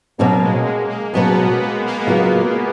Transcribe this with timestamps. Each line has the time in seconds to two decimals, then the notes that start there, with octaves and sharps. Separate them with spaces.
0.18 B2 F#3 A#3 C#4
0.43 G#3
0.66 G#3
0.89 A#3
1.13 B2 F#3 B3 C#4
1.60 A#3
1.73 G#3
1.87 A#3
2.07 C#3 F#3 B3 F4